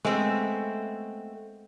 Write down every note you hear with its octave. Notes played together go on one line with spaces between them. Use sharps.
G#3 A3 B3 C4